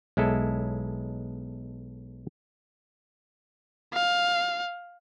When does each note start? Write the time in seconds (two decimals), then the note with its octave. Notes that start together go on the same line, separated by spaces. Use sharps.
0.17 B1 G#3 E4 A4
3.93 F5